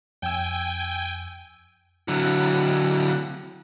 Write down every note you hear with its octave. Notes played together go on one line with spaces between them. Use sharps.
F2 G5 G#5 E6
D3 F#3